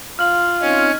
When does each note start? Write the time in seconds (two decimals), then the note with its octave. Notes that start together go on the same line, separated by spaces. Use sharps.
0.19 F4 F5 C6 F6 F#7
0.61 C4 C#4 D#4 D#5